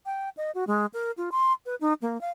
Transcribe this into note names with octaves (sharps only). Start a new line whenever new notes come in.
G5
D#5
F#4
G#3
A#4
F4
C6
B4
D#4
A#3
F5